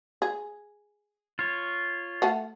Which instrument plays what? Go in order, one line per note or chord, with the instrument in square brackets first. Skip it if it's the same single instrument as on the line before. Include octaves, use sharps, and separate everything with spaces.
[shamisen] G#4
[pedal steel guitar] F4 C#5
[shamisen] A3 F#5 A5